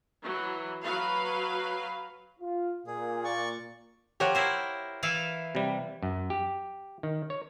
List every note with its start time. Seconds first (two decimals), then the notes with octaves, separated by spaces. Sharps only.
0.22 E3 F#3
0.83 F#3 B4 F5
2.40 F4
2.87 A#2 G#4
3.25 D5 C#6
4.20 F3 G4 A#4 C#5 F#5
4.35 E4 A#4 C5
5.03 E3 E4 F5
5.55 C3 G3
6.03 F#2
6.30 G4
7.03 D#3
7.30 C#5